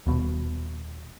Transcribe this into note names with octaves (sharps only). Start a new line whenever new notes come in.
D#1 B2